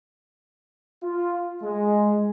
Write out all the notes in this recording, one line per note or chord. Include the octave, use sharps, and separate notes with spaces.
F4
G#3